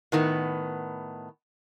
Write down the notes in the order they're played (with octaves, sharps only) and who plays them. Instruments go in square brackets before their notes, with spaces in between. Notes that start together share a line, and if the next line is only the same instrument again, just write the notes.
[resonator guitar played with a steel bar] A2 D#3 B3